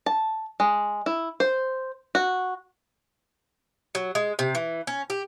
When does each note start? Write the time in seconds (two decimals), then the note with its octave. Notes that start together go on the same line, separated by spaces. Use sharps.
0.06 A5
0.60 G#3
1.06 E4
1.40 C5
2.15 F#4
3.95 F#3
4.15 G#3
4.39 C3
4.55 E3
4.87 C#4
5.10 G4